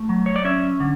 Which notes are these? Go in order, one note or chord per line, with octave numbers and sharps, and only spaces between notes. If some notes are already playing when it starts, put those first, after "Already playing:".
Already playing: A3
F#3
C#5
D5
C#4 E5
D3